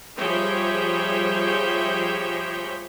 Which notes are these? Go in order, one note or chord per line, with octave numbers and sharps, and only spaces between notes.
F3 G3 G#4 C#5 E5 G5